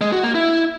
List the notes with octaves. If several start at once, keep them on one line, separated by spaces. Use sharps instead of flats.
G#3
F#4
A#3
E4